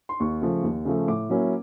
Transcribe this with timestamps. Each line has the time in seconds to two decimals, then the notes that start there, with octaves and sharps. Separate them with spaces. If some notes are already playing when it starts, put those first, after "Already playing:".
0.09 C6
0.20 D#2 C#6
0.42 C#3 F3 A3
0.63 D#2
0.85 C#3 F3 A3
1.08 A2 D6
1.30 F#3 A#3 C#4 E4